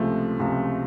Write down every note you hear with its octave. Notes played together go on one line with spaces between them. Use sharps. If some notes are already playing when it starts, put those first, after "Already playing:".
Already playing: C#2 C3 F3 G#3 A3
C#2 C3 F3 G#3